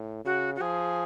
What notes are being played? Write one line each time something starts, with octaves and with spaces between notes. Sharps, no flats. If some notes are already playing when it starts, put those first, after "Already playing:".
Already playing: A2
C#3 F#4
F#4
F3 G#4